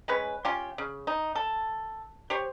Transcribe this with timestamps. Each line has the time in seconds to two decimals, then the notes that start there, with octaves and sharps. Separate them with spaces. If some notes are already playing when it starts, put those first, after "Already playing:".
0.08 G#3 C#4 B4
0.45 C#4 F4 G4
0.78 C#3
1.07 D#4
1.35 A4
2.30 G4 C5 C#5